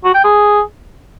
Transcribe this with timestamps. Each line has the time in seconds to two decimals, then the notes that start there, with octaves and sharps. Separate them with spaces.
0.04 F#4
0.14 G5
0.24 G#4